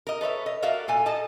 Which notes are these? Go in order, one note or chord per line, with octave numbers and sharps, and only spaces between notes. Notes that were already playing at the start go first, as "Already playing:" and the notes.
A#4 D#5
A4 B4 C#5 E5
D#5
F#4 A4 A#4 D5 E5 F5
A#2 A4 G#5
A4 D#5 A5